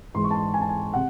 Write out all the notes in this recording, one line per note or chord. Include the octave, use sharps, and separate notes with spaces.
G#2 E3 G#3 C6
C#6
A5
C6
G#5
A5
G#5
C3 F#5